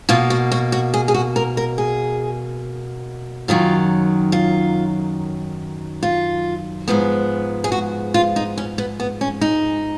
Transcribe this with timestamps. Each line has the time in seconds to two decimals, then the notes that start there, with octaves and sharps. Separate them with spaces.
0.09 B2 A#3 F4
0.30 F#4
0.52 F#4
0.72 F#4
0.94 G#4
1.08 G#4
1.14 F#4
1.36 A#4
1.57 A#4
1.78 G#4
3.48 F#2 D#3 F#3 F4
4.32 F4
6.03 F4
6.88 G#2 F3 G#3 B3
7.64 G#4
7.72 F#4
8.14 F4
8.36 D#4
8.58 C#4
8.78 B3
9.00 B3
9.21 C#4
9.41 D#4